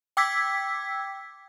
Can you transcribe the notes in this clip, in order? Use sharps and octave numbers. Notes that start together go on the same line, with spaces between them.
G5 D6 E6 G#6 B6